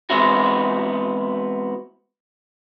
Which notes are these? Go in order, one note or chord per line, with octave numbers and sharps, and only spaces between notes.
E3 G#3 B3 C4 E4 F#4